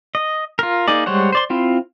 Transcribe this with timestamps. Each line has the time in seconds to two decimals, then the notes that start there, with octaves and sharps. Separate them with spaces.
0.15 D#5
0.59 F4 A#4
0.88 A#3 D#4 G#4 D5
1.06 G3 G#3 C5 C#5 F#5
1.32 C5 D5 C6
1.50 C4 E4 F4